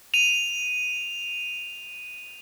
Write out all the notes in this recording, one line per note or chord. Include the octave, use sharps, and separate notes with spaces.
D#7 F7